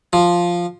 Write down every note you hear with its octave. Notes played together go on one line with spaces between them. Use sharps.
F3